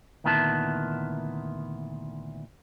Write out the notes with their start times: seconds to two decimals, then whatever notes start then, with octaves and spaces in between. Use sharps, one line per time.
0.24 D2 A#2 D#3 B3 E4 A5